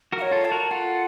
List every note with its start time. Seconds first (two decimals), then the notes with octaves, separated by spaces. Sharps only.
0.12 F#4 A#4
0.18 F5
0.22 C#5
0.31 F4 A4
0.45 A5
0.51 F#4 A#4
0.71 F4 A4 F#5